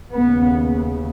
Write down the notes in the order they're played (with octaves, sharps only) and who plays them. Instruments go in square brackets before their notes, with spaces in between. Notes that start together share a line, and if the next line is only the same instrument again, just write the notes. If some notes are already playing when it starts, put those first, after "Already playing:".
[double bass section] D#2 C#3 B3